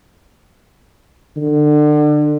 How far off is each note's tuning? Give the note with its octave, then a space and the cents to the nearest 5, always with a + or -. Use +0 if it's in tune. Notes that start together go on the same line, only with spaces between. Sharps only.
D3 +30